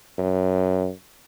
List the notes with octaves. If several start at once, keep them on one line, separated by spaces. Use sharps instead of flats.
F#2